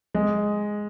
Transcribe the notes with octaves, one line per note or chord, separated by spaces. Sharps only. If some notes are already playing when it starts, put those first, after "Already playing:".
G#3